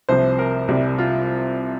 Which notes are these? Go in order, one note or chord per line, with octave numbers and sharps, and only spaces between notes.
C2 C3 F3 C5
A#4
C2 C3 G3
F4